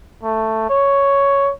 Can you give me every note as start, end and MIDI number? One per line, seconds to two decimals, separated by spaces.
0.23 0.65 57
0.70 1.52 73